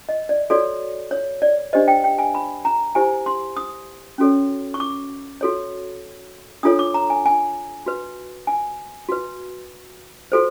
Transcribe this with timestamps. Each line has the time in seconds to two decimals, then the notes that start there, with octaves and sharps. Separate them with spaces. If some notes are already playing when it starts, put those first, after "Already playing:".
0.09 D#5
0.29 D5
0.50 F#4 A4 C#5 D5
1.11 C#5
1.42 D5
1.73 D4 G4 C5 D#5
1.88 G5
2.04 G5
2.19 G#5
2.35 B5
2.65 A#5
2.95 E4 G4 C5 G#5
3.26 C6
3.57 D#6
4.18 C#4 F#4 A4 C#5
4.74 C#6
4.80 D6
5.41 F#4 A4 C#5
6.63 D4 F4 A4 C#5 D#6
6.79 D6
6.94 A#5
7.10 G#5
7.26 G#5
7.86 F#4 B4
8.47 G#5
9.09 F#4 B4
10.32 F#4 A4 C5